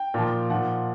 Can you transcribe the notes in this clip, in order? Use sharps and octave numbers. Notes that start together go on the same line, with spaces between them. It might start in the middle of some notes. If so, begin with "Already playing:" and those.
Already playing: G5
A#2 F3
A#2 F3 F#5